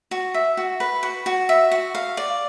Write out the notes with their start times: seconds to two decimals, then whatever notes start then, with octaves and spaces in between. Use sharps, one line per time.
0.11 F#4
0.34 E5
0.57 F#4
0.80 B4
1.03 F#4
1.26 F#4
1.49 E5
1.71 F#4
1.95 F5
2.17 D5